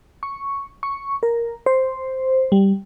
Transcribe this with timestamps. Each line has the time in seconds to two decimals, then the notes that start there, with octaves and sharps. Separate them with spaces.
0.23 C#6
0.83 C#6
1.23 A#4
1.66 C5
2.52 G3